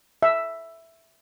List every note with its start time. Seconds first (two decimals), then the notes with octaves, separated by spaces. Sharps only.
0.23 E5